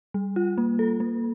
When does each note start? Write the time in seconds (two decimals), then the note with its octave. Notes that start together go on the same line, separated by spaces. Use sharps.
0.14 G3
0.36 F4
0.58 A#3
0.79 A4
1.00 A#3